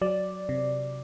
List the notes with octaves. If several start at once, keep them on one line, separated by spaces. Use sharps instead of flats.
F#3 D5
C3